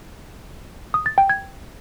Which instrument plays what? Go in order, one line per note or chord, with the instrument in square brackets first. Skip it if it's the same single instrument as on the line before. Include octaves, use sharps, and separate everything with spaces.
[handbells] D#6
A6
G5
G#6